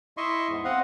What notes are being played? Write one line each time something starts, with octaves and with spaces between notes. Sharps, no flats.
E4 D#5 E5 C6 C#6
E2 G#2
C4 D#5 F5 F#5